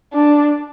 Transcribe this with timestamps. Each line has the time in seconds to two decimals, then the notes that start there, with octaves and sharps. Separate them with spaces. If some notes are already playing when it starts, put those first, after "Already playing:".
0.13 D4